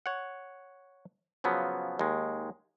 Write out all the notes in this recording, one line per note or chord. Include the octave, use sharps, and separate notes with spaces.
C#5 F#5
C#3 F3 F#3 B3
D#2 G#3